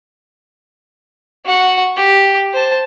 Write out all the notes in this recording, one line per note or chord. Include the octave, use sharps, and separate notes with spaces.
F#4 F#5
G4
C5 A5